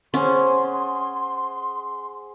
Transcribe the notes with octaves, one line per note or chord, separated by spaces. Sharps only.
C#4 G#4 C5 F#5 C6